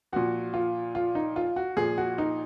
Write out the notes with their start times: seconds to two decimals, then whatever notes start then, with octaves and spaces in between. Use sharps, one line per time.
0.13 A#2 F3 F#4
0.54 F4
0.95 F4
1.15 D#4
1.36 F4
1.56 F#4
1.77 A#2 F3 G#4
1.98 F#4
2.18 D#4